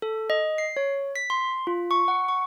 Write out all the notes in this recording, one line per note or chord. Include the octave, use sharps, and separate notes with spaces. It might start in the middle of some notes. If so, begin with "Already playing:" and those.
A4
D#5
C7
C#5
B6
C6
F4
C#6
F#5
C#6